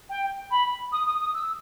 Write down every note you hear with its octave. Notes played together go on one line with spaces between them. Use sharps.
G5
B5
D#6
D#6
D#6
E6